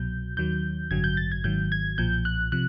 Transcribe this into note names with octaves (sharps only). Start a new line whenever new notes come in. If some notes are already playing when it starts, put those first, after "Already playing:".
Already playing: C2 B2 F#3 G6
D#2 D#3 F#3 G6
A1 G2 D3 F#3 G#6
G6
A6
G#6
G#1 G#2 D#3 F#3 G6
G#6
B1 A#2 F3 G6
F#6
C3 F3 F#6